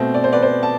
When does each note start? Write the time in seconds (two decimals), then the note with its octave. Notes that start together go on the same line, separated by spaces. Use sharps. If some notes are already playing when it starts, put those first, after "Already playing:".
Already playing: B2 A3 C4 C5
0.14 D5
0.24 C5
0.33 B4 D5
0.43 C5
0.63 A5